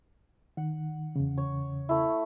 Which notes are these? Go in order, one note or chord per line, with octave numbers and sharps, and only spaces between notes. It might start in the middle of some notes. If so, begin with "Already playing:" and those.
D#3 F#5
E2 C#3
C#5
A3 E4